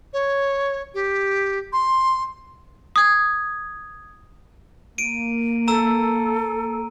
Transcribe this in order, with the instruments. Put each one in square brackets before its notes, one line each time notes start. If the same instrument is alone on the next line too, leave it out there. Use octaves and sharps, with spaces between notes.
[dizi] C#5
G4
C6
[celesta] D#6 G#6
[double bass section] A#3 [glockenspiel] D7 D#7
[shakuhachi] A4 [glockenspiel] A#5 E6